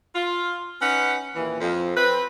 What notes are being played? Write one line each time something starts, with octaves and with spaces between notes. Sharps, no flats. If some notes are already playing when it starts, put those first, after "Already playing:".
F4
C#4 D#4 B4 F#5
D#2 A#2 E3
F2
C4 B4